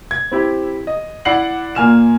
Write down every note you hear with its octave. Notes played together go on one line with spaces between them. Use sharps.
G#6
C4 E4 G4
D#5
E4 D5 F#5 C7 F#7
A#2 A#3 G#5 F6 E7